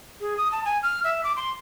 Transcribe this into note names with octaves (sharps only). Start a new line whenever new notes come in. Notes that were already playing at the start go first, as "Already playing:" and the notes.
G#4
D#6
A5
G#5
F6
E5
D6
C6